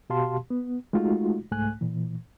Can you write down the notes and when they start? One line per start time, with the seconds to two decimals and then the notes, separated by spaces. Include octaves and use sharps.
0.10 B2 F#4 G4 F5 A5 C6
0.50 B3
0.93 G#3 A3 D#4 F4 F#4
1.51 C2 G#2 A3 G#5 F#6
1.81 A#2 E3